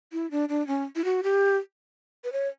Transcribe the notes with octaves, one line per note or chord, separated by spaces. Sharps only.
E4
D4
D4
C#4
E4
F#4
G4
B4
C#5